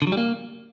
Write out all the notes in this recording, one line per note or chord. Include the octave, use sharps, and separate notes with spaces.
D3
F#3
G3
A#3